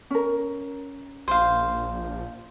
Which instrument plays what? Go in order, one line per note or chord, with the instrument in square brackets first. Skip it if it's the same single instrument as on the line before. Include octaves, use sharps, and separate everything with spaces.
[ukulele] C#4 A#4
[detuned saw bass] A#1 [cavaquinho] C5 F5